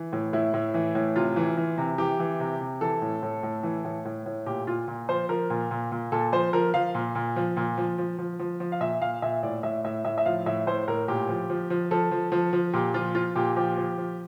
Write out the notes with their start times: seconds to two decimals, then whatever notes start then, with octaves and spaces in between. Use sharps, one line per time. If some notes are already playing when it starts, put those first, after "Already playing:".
Already playing: E3
0.13 A2
0.33 A2 E4
0.54 A2
0.74 E3
0.95 A2
1.16 C3 F4
1.36 E3
1.57 E3
1.78 C3
1.98 E3 G4
2.19 E3
2.40 C3
2.60 C3
2.81 E3 A4
3.02 A2
3.23 A2
3.43 A2
3.63 E3
3.85 A2
4.05 A2
4.26 A2
4.46 A#2 G4
4.67 A#2 F4
4.88 A#2
5.09 F3 C5
5.29 F3 A#4
5.50 A#2
5.71 A#2
5.92 A#2
6.12 A#2 A4
6.32 F3 C5
6.53 F3 A#4
6.74 F3 F5
6.95 A#2
7.15 A#2
7.36 F3
7.57 A#2
7.78 F3
7.98 F3
8.19 F3
8.39 F3
8.60 F3
8.72 F5
8.81 A#2 E5
9.01 A#2 F5
9.22 A#2 E5
9.43 A2 D5
9.63 A2 E5
9.84 A2 E5
10.05 A2 E5
10.18 E5
10.26 F3 F5
10.46 A2 E5
10.67 A2 C5
10.88 A2 A#4
11.08 A#2 G4
11.29 F3
11.50 F3
11.70 F3
11.91 F3 A4
12.11 F3
12.32 F3
12.53 F3
12.73 A#2 G4
12.94 F3 F4
13.15 F3 F4
13.36 A#2 G4
13.56 F3 G4
13.77 F3
13.98 F3